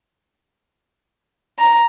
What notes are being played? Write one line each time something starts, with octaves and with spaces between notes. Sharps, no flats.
A#5